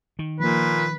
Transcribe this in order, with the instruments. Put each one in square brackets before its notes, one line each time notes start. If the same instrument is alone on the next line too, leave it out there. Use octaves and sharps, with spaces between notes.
[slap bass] D#3
[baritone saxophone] A#2 [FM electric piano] F3 A#3 [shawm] B4